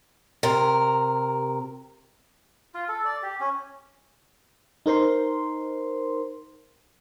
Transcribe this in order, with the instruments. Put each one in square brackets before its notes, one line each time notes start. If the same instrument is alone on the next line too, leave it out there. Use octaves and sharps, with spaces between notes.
[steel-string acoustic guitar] C3 A#4
[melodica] F4
A4
D5
G4
C#4
[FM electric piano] D#4 A#4 C5 C6